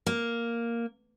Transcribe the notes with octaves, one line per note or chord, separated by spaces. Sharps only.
A#3